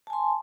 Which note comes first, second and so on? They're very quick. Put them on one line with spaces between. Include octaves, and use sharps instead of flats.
A5 G#5 C6